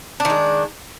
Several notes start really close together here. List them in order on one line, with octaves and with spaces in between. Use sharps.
D4 D#3 G#3